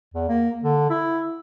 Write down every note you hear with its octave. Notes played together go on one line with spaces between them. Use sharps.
E2
A#3
D3
E4